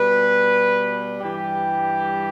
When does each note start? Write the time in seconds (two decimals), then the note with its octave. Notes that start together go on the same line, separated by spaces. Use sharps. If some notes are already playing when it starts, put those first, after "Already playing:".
Already playing: B2 G3 B4
1.20 G2 E3 G3 G4